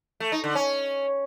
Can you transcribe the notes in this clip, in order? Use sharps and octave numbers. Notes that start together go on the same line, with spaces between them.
A3
D#4
D3
C#4